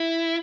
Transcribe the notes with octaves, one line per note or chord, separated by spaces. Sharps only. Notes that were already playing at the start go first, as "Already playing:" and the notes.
Already playing: E4